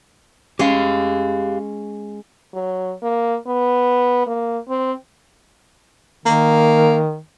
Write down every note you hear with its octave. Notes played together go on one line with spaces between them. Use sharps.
G#3 C#4 G4 F5
F#3
A#3
B3
A#3
C4
D#3 A#3